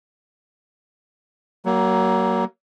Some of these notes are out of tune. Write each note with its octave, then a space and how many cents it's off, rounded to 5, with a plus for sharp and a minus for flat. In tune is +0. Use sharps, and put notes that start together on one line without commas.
F#3 +30 A#3 +0